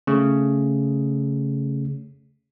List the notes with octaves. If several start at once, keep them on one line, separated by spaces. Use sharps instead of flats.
C#3 A3